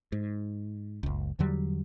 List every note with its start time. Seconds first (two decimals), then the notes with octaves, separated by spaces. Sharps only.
0.12 G#2
1.03 F#1 C#2
1.39 E2 D3 F#3 G3